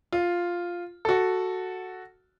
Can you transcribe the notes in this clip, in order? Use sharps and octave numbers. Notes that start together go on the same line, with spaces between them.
F4
F#4 A4